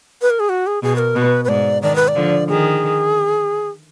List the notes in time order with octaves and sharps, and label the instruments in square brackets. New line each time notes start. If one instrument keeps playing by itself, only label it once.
[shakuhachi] B4
A#4
G#4
F#4
G#4
[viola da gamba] B2 [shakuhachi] G#4
[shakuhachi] B4
A#4
[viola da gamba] B2 [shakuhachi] B4
[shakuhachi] B4
[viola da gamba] G#2 [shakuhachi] D5
[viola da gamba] D#3 [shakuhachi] D5
[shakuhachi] B4
D5
[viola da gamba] D3 F3
[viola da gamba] D#3 [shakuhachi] G#4